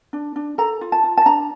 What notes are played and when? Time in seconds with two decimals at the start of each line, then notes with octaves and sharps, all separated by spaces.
0.13 D4
0.36 D4
0.58 A4 A#5
0.81 F4
0.92 A5
1.04 F4
1.18 A5
1.26 D4 A#5